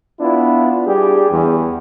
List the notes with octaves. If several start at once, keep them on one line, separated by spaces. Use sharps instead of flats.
B3 D4 E4 F4
G3 D4 G4 G#4
E2